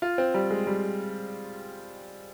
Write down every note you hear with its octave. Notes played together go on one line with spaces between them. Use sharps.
F4
C4
G3
G#3
G3